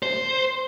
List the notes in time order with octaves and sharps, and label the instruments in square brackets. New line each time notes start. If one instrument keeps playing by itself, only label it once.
[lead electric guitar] C5